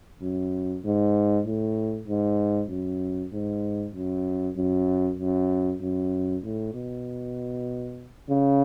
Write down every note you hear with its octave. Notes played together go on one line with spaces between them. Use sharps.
F#2
G#2
A2
G#2
F#2
G#2
F#2
F#2
F#2
F#2
A2
B2
C#3